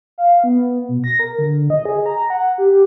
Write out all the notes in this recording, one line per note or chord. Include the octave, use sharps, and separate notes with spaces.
F5
B3
B2
A#6
A#4
D3
D#5
G#4
A#5
F#5
G4